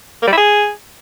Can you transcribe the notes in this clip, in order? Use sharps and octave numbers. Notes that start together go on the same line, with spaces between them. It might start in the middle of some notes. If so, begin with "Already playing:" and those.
A#3
G3
E4
G#4